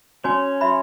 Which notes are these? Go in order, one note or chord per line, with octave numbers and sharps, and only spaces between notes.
C#4 F#4 C#5 G#5
F#4 E5 B5